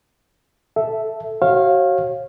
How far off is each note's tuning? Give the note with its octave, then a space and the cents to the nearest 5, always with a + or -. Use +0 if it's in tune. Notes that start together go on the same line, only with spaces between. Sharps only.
A4 +0 E5 +0
F#4 +30 C#5 -35 F5 +0